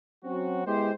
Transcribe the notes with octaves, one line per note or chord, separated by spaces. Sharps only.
F#3 C4 C#4 F#4
G#3 B3 E4 G4 C5